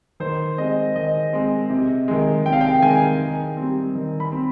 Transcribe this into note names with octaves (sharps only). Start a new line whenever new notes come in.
D#3 C5
G#3 C4 D#5
D#3 D#5
G#3 C4
C3
D#3 G#3
C3 G5
F5
G5
D#3 G#3 G#5
D#3
G3 C4
D#3
B5
C4